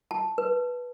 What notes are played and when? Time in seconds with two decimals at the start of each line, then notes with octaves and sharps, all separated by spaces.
0.11 A5
0.38 B4